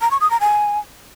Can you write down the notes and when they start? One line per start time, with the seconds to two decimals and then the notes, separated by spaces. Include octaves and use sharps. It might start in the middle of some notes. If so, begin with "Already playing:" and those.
0.01 A#5
0.11 C#6
0.21 D#6
0.31 A#5
0.40 G#5